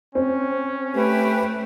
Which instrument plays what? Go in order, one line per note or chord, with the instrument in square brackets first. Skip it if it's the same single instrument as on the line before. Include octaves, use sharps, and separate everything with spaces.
[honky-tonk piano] C4 [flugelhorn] C#4
[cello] A3 [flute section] G4 B4